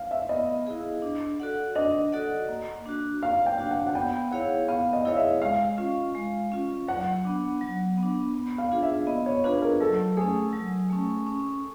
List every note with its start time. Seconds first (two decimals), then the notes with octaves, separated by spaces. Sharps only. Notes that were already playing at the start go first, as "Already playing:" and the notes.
Already playing: F5
0.11 E5
0.29 B3 D#5
0.67 E4 G#4
1.02 D4
1.40 F#4 A4 D5 F#5
1.75 D4 D#5
2.12 F#4 A4 D5 F#5
2.49 A#3
2.86 D4 F#4
3.22 A#3 F5
3.46 G5
3.58 D4 F#4
3.71 F#5
3.87 F#5
3.95 B3 G5
4.32 E4 G#4 C#5 F5 F#5
4.68 B3 F5
4.93 D#5
5.05 E4 G#4 C#5 D#5 F5
5.17 E5
5.42 G#3 F5
5.78 C#4 F4
6.15 G#3
6.52 C#4 F4
6.87 F#3 F#5
7.25 B3 D4
7.61 F#3
7.98 B3
8.03 D4
8.34 B3
8.58 F5
8.71 D4 F4 G#4
8.83 E5
9.07 B3 D#5
9.26 C#5
9.44 D4 F4 G#4 B4
9.62 A#4
9.80 F#3 A4
10.17 A3 C#4 G#4
10.53 F#3
10.90 A3 C#4
11.27 C#4